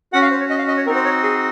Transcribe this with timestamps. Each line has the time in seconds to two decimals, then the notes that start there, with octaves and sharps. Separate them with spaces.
0.13 C#4 F#4 F#5
0.22 F5
0.31 C5
0.40 C#5
0.50 D#5
0.58 F5
0.68 D#5
0.77 C#5
0.86 C4 D#4 F#4 A#4
0.96 C5
1.05 C#5
1.23 G#4